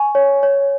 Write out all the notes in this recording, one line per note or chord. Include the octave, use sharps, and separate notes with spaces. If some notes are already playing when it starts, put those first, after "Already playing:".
Already playing: G#5 C#6
C#5
C#5